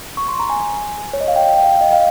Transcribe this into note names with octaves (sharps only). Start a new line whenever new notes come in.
C#6
C6
A#5
G#5
C#5
D#5
F5
G5
G5
F5
D#5
F5